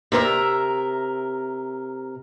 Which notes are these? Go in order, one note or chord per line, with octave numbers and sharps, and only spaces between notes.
C3 A#4 C5 E5